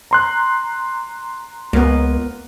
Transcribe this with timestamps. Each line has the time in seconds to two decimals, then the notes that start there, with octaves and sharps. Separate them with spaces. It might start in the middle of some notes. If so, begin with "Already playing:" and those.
0.11 A#5 C6 F#6
1.73 C#2 A#3 B3